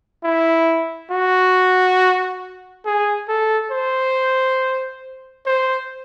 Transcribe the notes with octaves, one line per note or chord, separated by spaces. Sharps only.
E4
F#4
G#4
A4
C5
C5